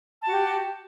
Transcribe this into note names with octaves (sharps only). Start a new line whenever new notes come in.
F#4 G4 A5